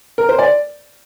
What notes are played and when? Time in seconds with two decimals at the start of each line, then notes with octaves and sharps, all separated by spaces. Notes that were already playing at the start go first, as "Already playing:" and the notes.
0.18 A#4
0.29 C5
0.39 D5